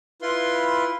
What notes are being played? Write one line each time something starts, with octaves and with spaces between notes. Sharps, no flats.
E4 F4 B4 C6